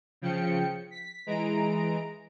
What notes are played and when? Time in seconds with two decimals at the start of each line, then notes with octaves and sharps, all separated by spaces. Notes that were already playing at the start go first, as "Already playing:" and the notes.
0.22 C#3 F3 G5 C#7
0.91 B6
1.26 E3 G#3 A#5 D7